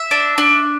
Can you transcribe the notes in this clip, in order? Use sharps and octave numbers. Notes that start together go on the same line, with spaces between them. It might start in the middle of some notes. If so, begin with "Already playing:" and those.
Already playing: E5
D4
D4